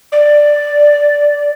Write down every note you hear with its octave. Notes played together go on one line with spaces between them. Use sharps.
D5